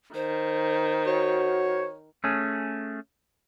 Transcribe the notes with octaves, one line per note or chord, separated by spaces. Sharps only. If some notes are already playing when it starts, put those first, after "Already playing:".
D#3 C5
F#4 C#5
A3 C#4 G#4